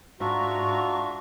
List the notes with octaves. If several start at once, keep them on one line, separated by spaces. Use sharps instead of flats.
G#2 D4 F4 F#4 E5 A#5 C#6